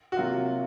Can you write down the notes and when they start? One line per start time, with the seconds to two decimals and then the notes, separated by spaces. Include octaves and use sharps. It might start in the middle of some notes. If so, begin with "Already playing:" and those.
0.12 F#4
0.17 C3 F#3 A#3 F4